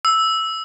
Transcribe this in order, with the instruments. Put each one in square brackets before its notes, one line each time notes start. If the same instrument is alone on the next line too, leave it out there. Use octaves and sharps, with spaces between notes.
[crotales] E6